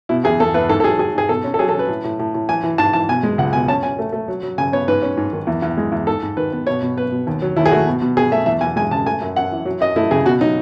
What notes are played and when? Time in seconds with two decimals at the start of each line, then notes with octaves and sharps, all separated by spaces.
0.09 B2 E4
0.24 E2 G#4
0.40 E2 A4
0.54 E2 B4
0.69 G#2 A4
0.80 A4
0.84 F#3 G#4
0.99 F#3 G#4
1.15 G#2 G#4
1.29 B2 A4
1.44 C#4
1.54 A4
1.59 F#3 G#4
1.69 A4
1.74 C#4 B4
1.89 A2
2.04 A2
2.19 A2
2.34 A2
2.49 E3 G#5
2.63 E3
2.78 G#2 A5
2.93 E3 A5
3.09 B2 G#5
3.23 G#3
3.38 C#2 F#5
3.53 B2 G#5
3.68 C#4 A5
3.83 C#4 G#5
3.99 A3
4.13 A3
4.28 F#3
4.43 F#3
4.58 C#3 G#5
4.72 B3 C#5
4.88 G#2 B4
5.02 C#4
5.17 G#2
5.33 D#3
5.47 E2
5.62 E2
5.77 G#3
5.92 E2
6.07 G#2 A4
6.22 G#2
6.37 D#3 B4
6.52 B3
6.67 B2 C#5
6.82 B2
6.97 B3 B4
7.12 B2
7.27 D#2
7.42 F#3
7.56 D#2 E4
7.66 G#4
7.71 A3 F#4
7.87 B2
8.01 B2
8.17 B2 G#4
8.32 A3 E5
8.46 E2 E5
8.61 E2 G#5
8.76 G#3 G#5
8.91 C#3 A5
9.06 A3 G#5
9.21 F#2
9.36 F#2 F#5
9.52 E3
9.65 F#3
9.80 F#2 D#5
9.96 A3 E4
10.11 C#3 G#4
10.25 B2 F#4
10.41 F#3 D#4